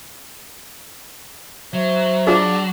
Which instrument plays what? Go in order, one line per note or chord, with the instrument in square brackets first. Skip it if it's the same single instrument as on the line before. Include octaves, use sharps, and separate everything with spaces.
[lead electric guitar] F#3 [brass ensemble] C5 E5
[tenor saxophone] D4 [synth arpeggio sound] F4 G#4